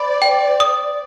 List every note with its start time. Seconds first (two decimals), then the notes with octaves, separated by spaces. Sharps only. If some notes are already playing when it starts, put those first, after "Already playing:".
Already playing: C5 D5 B5
0.22 G5
0.60 D#6